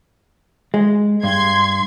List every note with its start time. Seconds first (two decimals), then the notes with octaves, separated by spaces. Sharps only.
0.74 G#3
1.23 G2 C6 G#6